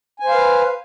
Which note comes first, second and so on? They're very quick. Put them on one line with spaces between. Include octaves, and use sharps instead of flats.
G#5 C5 F5 B4